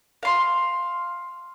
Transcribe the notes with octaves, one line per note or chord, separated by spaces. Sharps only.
F5 C6